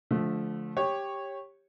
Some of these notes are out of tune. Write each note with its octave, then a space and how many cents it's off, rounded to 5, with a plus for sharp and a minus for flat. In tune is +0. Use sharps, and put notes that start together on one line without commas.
D3 -20 F3 +0 A3 -25
G4 +5 C#5 -10